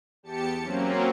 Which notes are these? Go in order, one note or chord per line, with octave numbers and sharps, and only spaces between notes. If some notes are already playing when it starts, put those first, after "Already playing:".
E2 G4 A5 C#7
F#3 A#3 C4 C#4